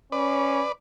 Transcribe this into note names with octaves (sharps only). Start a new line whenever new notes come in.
C#4 B4 D5